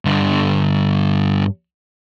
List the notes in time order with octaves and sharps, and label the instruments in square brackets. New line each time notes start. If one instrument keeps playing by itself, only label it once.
[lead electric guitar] G2 D3